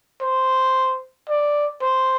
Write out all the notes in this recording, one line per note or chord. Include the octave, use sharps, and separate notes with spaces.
C5
D5
C5